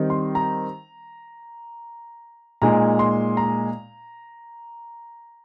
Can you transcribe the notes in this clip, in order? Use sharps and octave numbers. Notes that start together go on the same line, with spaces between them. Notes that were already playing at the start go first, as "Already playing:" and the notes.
Already playing: D#3 G3 C4 D#4
C6
A#5
A#2 G#3 D#4 A#5
C6
A#5